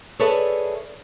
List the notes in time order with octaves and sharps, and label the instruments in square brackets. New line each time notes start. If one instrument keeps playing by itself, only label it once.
[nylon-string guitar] G#4 A4 B4 C#5 D5 E5